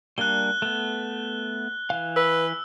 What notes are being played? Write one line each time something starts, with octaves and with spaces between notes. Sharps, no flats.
G3 A#3 D4 F#6 G7
A3 B3
E3 F5
B4 E6